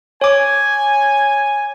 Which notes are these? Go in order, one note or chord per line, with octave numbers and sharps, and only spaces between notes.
C#5 G#5 D6